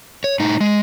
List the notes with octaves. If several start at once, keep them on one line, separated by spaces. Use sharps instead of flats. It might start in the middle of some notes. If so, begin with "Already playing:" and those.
C#5
A2 D#4
G#3